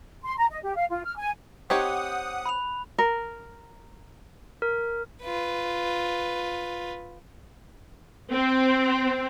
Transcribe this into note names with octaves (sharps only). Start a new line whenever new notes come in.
C6
A#5
D#5
G4
F5
F4
F6
G#5
C4 D#4 G4 C#5 F#5 D#6
B5 F#6 F7
A#4
A#4
F4 B4
C4